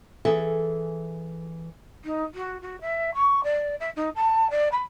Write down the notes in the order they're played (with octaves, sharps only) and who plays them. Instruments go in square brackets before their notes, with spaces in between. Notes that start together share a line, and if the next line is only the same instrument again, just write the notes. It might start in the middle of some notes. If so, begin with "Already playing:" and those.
[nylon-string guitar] E3 G#4 A4 E5
[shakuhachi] D#4
F#4
F#4
E5
C#6
D5
E5
D#4
A5
D5
B5